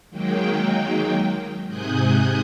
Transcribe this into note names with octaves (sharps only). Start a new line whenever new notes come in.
D#3 F#3 G#3 A#3 G5
G#2 C3 G#5 D#6 F#6 G6